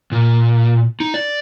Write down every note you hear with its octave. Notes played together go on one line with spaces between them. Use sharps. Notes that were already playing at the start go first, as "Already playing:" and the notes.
A#2
D#4
D5